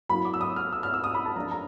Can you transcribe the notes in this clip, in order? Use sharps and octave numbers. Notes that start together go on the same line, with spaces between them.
F#3 A#3 C#4 E4 B5
D6
E6
D#6
F6
E6
F6
E6
D#6
B5
A5
F3 A#3 D4 A#5
A#5